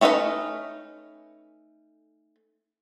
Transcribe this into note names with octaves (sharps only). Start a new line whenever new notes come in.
A3 C#4 D#4 A#4 B4